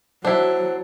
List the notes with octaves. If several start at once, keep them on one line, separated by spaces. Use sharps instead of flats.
F#3 D4 E4 C5